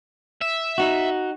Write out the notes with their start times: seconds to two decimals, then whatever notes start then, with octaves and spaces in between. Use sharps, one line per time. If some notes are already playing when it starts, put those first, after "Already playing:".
0.41 E5
0.78 D#4 F#4